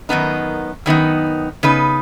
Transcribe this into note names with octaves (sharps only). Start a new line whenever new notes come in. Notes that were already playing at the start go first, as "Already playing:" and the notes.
F#2 D#3 B3 D#4
F#2 D#3 B3 D#4
C#3 B3 D#4 B4